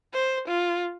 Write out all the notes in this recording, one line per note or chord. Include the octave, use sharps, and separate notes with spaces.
C5
F4